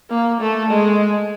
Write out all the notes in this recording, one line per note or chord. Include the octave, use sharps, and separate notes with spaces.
A#3
A3
G#3